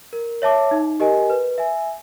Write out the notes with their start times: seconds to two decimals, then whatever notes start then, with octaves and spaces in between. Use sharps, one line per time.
0.13 A#4
0.42 C#5 E5 A5 D6
0.71 D#4
1.00 G4 A#4 D#5 G#5
1.30 B4
1.58 E5 G#5